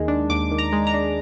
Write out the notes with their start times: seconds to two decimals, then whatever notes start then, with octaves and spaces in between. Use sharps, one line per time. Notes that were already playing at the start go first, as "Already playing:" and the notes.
Already playing: D#2 D#3 G#3
0.08 D4
0.30 D#2 D6
0.51 D#3
0.58 A#5
0.73 G#3
0.87 A#5
0.94 D4